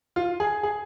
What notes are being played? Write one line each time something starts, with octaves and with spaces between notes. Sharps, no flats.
F4
G#4
G#4